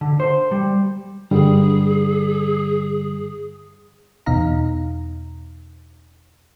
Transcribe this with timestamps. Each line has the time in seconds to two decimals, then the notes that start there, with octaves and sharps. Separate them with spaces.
0.01 D3
0.20 C5
0.52 G3
1.31 G2 D3 G3 G#4
4.26 E2 B2 D#4 D#5 F5 A#5